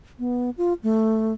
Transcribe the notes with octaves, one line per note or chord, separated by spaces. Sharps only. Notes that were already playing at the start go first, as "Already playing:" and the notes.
B3
F4
A3